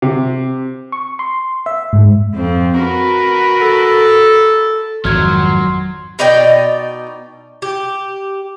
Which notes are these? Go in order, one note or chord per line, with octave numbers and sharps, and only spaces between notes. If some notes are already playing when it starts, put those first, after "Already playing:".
C3
C#6
C6
E5
G#2
F2 C4
F#4 A#4 B4
A4
G#1 F2 D#3 F#3 C6 F6 G#6
B2 D#4 D5 G5
G4